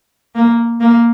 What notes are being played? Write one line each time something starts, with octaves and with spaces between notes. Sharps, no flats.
A#3
A#3